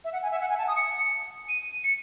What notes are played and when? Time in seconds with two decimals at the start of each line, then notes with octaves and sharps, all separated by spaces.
0.04 E5
0.13 F#5
0.23 G#5
0.31 E5
0.41 F#5
0.49 G#5
0.58 A5
0.68 D#6
0.76 C#7
1.49 D#7
1.84 C#7